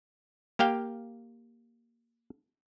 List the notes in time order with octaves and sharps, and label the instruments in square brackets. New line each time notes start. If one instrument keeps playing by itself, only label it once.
[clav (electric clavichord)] A#3 G4 F5 G5